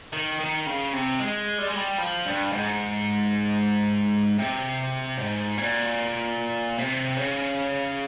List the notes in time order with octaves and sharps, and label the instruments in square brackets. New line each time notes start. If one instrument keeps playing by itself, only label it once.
[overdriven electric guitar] D#3
D#3
C#3
C3
G#3
G3
G#3
G3
F3
G2
G#2
C3
G#2
A#2
C3
C#3